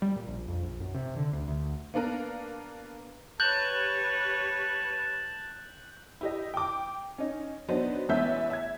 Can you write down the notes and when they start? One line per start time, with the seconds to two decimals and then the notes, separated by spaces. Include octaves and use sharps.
0.02 G3
0.16 A#2
0.28 A#1
0.48 F2
0.62 A#1
0.80 F#2
0.94 C3
1.17 D3
1.33 D2
1.48 D2
1.94 A#3 B3 D4 A#4
3.40 G4 B4 C#5 A5 F#6 G6 F#7
6.21 E4 G4 D#5
6.54 G5 D6
7.18 C#4 D#4
7.68 F#3 B3 D4 D#4 C5
8.09 A1 G#3 B3 E5 G6
8.50 E5 G#6